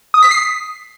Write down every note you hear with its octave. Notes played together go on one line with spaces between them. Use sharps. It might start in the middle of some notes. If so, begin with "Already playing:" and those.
D#6
B6
C7